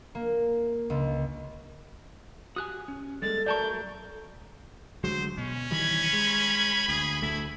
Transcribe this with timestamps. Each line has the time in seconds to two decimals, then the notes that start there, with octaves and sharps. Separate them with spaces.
0.15 A#3
0.90 C#2
2.56 F#4 G4 G#5 D#6 F#6
2.88 C#4
3.22 G3 G#3 A#3 A4 A6
3.46 F#3 A3 A#4 D5 A5 C#6 G6
5.04 D2 F#3 G#3 C5
5.38 B2 C#4
5.71 D#3 E3 G3 B5 G#6
6.13 G#3
6.88 D2 G#4
7.22 D2 A3 E4